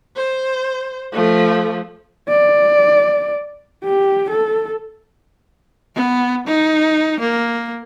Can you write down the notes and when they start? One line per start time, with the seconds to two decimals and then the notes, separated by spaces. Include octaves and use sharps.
0.16 C5
1.12 F3 A3
2.29 D5
3.84 G4
4.31 A4
5.95 B3
6.47 D#4
7.20 A#3